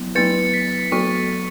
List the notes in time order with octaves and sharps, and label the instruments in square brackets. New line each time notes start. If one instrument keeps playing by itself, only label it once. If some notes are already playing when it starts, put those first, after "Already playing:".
Already playing: [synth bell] F#3 B3 E4
[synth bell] F#3 B3 E4 B4 [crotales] A6 C#7
[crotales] B6
[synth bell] F#3 B3 F#4 A4 [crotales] C#6